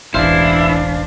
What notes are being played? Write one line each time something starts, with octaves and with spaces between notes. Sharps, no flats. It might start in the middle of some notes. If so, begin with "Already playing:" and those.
E1 A1 E3 D4 E4 C5 F5 C7